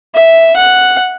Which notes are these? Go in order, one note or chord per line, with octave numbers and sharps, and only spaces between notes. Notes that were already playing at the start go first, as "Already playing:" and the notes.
E5
F#5